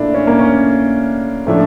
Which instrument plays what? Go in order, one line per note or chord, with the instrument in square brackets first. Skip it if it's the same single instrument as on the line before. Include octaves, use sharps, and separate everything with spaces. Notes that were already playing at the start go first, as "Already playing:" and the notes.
Already playing: [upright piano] A#2 A3 E4 [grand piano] D4
[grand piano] C#4
A#3
C#4
[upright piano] A2 F3 A3 D4 A4